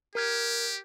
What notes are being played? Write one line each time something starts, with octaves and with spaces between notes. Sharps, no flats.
G4 A#4 F6 G#6